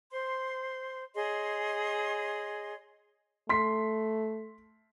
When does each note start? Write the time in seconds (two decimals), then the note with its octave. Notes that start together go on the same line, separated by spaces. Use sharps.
0.11 C5 C6
1.14 G#4 C#5 D#5 C6
3.49 A3 C6 B6